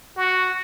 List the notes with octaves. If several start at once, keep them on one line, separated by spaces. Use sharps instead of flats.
F#4